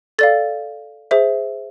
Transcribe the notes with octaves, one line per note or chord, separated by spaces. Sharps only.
A4 D5 F5 A6
G#4 C5 E5